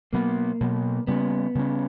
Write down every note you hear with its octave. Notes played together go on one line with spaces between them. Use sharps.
B2 F#3 A#3 B3
B2 F#3 B3
C#3 G3 A#3 B3 C#4
C#3 G3 A#3 C#4